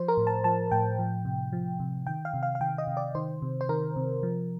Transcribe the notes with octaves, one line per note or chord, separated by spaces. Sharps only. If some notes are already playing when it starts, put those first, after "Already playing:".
Already playing: F3 C5
A#4
A2
A5
F3 A5
A2 G5
F3
C3
F3
C3
D#3 G5
F5
C3
F5
F5
D#3 G5
D#5
C3
D5
D#3 C5
C3
C5
D#3 A#4
C3
F3